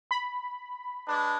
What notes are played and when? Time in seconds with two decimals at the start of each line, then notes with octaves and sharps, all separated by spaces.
0.11 B5
1.06 G#3 D4 B4